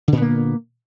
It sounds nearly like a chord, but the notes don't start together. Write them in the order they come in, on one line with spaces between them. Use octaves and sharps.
D3 A#2 B3 A#3